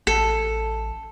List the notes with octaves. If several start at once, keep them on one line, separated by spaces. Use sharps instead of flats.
A1 A4